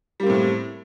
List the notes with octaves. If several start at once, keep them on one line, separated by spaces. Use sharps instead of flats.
A2 G3 A#3 C4